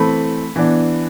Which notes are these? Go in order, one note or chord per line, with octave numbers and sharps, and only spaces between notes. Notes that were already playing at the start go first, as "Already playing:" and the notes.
Already playing: E3 A3 C4 B5
E3 B3 D4